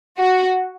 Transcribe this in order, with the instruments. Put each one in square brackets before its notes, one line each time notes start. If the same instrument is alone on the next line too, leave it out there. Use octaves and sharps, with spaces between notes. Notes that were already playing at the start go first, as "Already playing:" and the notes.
[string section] F#4